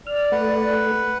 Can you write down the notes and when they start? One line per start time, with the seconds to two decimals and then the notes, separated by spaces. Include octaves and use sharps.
0.07 D5 F6
0.32 A3 B4 F#5